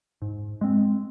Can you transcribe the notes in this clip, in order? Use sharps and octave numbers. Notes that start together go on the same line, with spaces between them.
G#2
G#3 C4